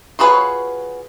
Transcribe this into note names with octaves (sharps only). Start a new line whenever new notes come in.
F4 F#4 G#4 B4 C#5